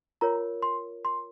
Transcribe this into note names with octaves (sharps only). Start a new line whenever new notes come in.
F4 A#4 C#5 A#5
C6
C6